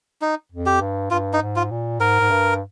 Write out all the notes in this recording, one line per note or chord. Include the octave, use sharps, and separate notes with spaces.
D#4
F2
G4
G2
G2 F4
D#4
G#2
F4
A#2
G#2 A#4
G#2
G2